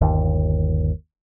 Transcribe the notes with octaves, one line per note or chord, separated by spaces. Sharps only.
G1 D#2